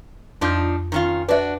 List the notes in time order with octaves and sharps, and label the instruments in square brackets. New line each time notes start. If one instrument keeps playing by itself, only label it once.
[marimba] F2 G6 [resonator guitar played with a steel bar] F3 D4 D#4
[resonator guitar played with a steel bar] D#3 C#4 F4
[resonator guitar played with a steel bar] D4 F#4 [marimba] B4 D5 E5